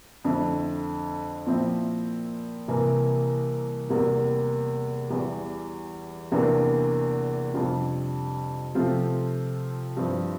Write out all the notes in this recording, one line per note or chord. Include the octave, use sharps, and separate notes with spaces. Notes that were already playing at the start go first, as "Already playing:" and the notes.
F2 D3 A3 E4
A#2 F3 C4 E4
C2 C3 E3 A#3
E2 C3 G3 A#3
E2 E3 G3
E2 C3 E3 A#3 D4
F2 C3 G3 D4 F4
C3 F3 A3 C4 F4
G2 F3 C4 E4